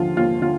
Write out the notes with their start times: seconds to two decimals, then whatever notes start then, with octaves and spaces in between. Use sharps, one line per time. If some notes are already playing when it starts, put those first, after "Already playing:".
Already playing: D#2 D3 F3 F4
0.16 D#2 F4
0.42 D3 F4